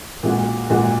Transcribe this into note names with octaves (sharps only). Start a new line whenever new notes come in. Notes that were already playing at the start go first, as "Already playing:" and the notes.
A#2 G#3 F#4
A#2 G#3 F#4